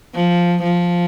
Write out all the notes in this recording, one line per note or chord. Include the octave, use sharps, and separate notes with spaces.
F3
F3